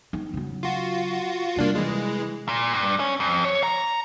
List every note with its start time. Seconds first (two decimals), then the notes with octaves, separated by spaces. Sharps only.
0.13 D#3
0.33 C#3 F#3
0.63 F4 F#4
1.57 C3 G3 A#3 D4 F4
1.75 E3 G#3
2.49 A#2
2.73 G2
3.00 C#4
3.20 F2
3.45 C#5
3.63 A#5